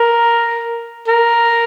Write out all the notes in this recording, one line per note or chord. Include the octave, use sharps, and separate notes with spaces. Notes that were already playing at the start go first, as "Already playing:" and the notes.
Already playing: A#4
A#4